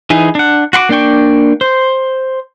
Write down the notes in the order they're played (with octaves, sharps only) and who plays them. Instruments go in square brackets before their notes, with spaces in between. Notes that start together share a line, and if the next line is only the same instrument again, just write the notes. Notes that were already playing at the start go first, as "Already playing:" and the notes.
[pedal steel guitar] E3 D#4 G#4
D4 F#5
F#4 F#5 C6 D6
A#3 D4 D5 G5 C#6
C5